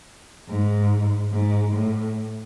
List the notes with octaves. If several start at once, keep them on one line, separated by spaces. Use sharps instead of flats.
G#2
G#2
A2